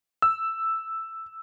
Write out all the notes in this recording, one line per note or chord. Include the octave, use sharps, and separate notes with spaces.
E6